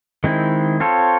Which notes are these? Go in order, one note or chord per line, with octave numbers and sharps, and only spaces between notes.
D#3 G#3 C4 E4
C4 F4 A4 C#5